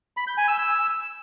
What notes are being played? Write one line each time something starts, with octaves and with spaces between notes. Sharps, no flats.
B5
G6
G#5
E6
E6